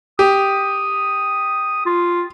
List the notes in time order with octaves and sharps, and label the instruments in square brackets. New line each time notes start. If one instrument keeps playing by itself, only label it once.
[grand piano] G4 [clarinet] D#6
[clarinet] F4